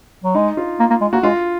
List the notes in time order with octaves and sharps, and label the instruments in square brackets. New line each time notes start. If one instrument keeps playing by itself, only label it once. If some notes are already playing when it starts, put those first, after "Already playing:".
[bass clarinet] F#3
[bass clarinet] G#3 [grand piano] D#4
[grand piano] F4
[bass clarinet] A#3
A#3
G#3
[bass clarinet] A#3 [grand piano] F#4
[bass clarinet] G#3 [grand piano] F4